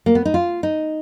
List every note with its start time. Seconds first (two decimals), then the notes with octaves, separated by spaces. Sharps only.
0.06 A#3
0.15 B3
0.25 D#4
0.34 F4
0.63 D#4